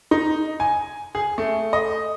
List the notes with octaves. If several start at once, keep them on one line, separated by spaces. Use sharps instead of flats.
D#4
G#5
G#4
A3
D#5